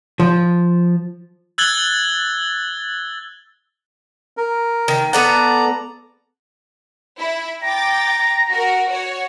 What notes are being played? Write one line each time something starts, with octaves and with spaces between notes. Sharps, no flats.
F3
E6 F#6 G#6 A6 F#7 G7
A#4
D#3
B3 A4 D5 F#5 A#5
E4
G5 A#5 D6 A6
F#4 A#4
F#4 C#5